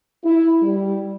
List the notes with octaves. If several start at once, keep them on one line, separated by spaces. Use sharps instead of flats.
E4
G3